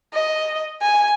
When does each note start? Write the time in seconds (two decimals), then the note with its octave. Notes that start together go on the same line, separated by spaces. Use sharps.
0.14 D#5
0.82 G#5